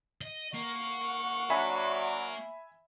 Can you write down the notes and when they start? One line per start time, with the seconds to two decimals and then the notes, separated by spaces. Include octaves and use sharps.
0.21 D#5
0.54 A#3 F#5 C#6
1.50 F#3 D4 E5 G#5 B5